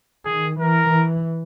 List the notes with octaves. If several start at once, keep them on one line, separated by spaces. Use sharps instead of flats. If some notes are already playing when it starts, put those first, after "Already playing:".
D#3 G#4
E3 A#4
E3